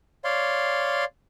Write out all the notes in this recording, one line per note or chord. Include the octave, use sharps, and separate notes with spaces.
C#5 D5 F5 C6